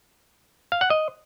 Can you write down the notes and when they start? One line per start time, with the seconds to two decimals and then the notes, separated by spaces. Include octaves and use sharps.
0.72 F5
0.81 F#5
0.90 D#5